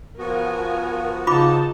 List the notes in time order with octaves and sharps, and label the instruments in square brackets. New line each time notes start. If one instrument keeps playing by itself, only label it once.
[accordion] F3 B3 F#4 [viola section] A#4 G#5
[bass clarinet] C#3 [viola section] D#4 A5 [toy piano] F4 B5 D6